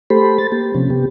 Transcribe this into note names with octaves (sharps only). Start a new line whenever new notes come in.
A3 G4 A4 C5 B5
A6
A#3 G4
C3 F3 C4 C#4
C3 B3 G4